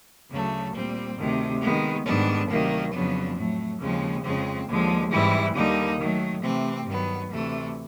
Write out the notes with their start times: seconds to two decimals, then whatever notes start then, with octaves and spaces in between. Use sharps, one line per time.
0.31 D2 C#3 F#3 A3
0.74 A#2 G3 C4
1.18 D2 C3 D#3
1.62 D#3 G#3 B3
2.06 G#2 D#3 G3 B3 D4
2.49 D2 C3 D#3 F#3 A#3
2.92 F2 C#3 F#3 B3 D4
3.36 A2 F#3 A3
3.80 D#2 C#3 F3 G#3 C4
4.24 F2 C#3 F3 G#3 C4
4.68 D#2 D3 F3 G#3
5.11 G#2 E3 G3 C4 E4
5.55 D#2 D3 G3 A#3 D#4
5.99 D#3 F#3 A3
6.43 C3 E3 A3 C4
6.86 G2 D#3 F#3 B3
7.31 D2 C3 E3 A3